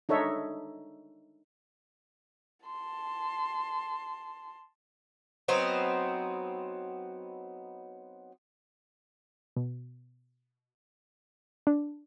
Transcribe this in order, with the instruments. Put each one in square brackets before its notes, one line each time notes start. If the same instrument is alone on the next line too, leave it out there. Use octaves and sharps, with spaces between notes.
[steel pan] D4 D#4 A4 C#5 E5
[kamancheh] A5 C6
[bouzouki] F#3 B3 C4 D#4
[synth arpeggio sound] B2
D4